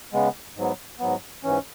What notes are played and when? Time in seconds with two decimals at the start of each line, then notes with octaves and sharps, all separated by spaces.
0.13 C#3 G#3 B3
0.56 G#2 F#3 B3
1.00 G#2 F#3 B3
1.44 G#2 E3 C#4